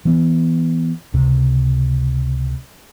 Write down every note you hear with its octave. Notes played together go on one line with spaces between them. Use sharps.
E3 B3
C#2 C3